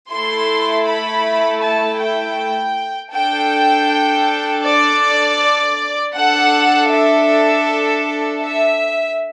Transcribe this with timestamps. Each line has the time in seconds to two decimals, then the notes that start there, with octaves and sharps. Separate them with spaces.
0.11 A3 E4 A4 C6
0.87 B5
1.63 A5
2.00 G5
3.13 D4 A4 G5
4.65 D5
6.15 D4 A4 F#5
6.90 E5
8.41 E5